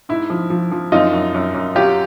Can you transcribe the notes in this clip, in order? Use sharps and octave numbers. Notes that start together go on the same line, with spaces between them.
G#2 E4
F3
F3
F3
F#2 D#4 F4
F#2
F#2
F#2
F#3 F4 G4